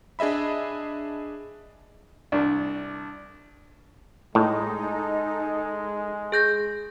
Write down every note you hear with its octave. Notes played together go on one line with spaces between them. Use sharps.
D4 G#4 D#5 E5 B5
C2 D4
A2 G#3 D#4 A4
G#4 G6 A#6